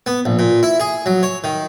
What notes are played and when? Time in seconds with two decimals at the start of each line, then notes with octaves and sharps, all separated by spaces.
0.06 B3
0.25 A#1
0.39 A#2
0.63 E4
0.80 G#4
1.06 F#3
1.23 C#5
1.44 D#3